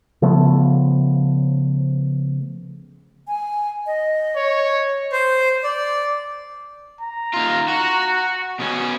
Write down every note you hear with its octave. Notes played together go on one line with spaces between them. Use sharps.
C#3 F3 A3 B3
G#5
D#5
C#5
C5
D5
A#5
D#2 F4
F#4
B2 C#4